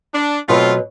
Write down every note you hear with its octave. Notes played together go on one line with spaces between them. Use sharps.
D4
B2 F#3 A3 C4 F4 B4